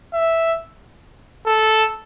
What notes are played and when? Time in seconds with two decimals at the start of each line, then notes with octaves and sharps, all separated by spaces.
0.14 E5
1.47 A4